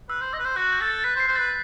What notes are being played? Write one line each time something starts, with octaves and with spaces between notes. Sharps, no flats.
B4 E6
C5
D#5 E6
B4
C5 E6
F#4 F#6
G6
A4
A6
B4 B6
C5
C7
C5
B4 A6